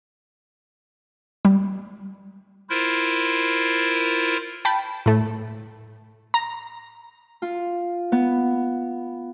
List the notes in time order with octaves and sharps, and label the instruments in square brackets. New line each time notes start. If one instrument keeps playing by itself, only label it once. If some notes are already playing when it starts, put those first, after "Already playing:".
[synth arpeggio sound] G3
[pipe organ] E4 F4 A#4 C5
[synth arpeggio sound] G5 A5 B5
A2 A3
A#5
[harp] F4
B3